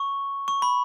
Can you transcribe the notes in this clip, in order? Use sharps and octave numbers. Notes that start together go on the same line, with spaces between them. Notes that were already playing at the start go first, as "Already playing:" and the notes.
Already playing: C#6
C#6
B5